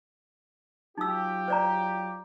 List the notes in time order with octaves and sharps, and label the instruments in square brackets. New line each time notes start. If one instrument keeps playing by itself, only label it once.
[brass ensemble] F#3 F4 G4 [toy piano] D#4 E6
[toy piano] C5 D5 A#5